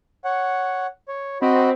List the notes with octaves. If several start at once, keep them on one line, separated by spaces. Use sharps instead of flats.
C#5 F#5
C#5
C4 F#4 D#5 B5